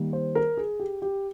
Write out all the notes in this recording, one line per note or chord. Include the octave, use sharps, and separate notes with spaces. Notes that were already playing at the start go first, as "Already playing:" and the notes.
Already playing: D#3 G3 A#3
C5
A#4
G#4
G4
G4